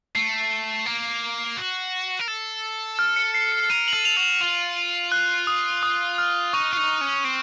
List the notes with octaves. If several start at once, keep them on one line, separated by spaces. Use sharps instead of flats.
A3 C7
A#3
F#4
A#4
A4
F6
C#7
C7
C#7
A#4 D#7
F#7
A4
F7
F#4
F#7
F4 F7
F#6
D#6
D#6
F6
D#4 C#6
F4
D#4
C#4
C4